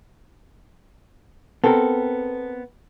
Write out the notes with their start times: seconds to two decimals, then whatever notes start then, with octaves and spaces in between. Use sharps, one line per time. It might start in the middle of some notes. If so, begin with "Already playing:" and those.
1.64 B3 C4 A4 A#4